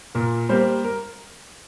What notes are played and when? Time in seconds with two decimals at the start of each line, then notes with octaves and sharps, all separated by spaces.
0.15 A#2 A#4
0.49 G3 A#3 C5
0.84 A#4